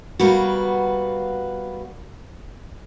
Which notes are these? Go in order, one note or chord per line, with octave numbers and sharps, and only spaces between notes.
G3 A#3 B3 F#4